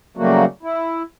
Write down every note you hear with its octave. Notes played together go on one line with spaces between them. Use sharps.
C#3 F#3 G3 A3 A#3 F#4
E4